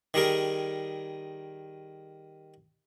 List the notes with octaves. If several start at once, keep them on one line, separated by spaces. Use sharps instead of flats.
D#3 G3 G#4 A#4